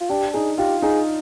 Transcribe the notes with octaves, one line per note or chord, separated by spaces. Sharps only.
F4
D4 G4
D#4 G#4
F4 G4
D#4 G#4